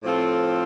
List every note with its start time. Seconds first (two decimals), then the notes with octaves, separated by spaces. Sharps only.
0.03 A2 F3 C4 F4 A4